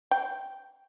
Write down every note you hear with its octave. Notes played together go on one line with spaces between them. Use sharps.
G5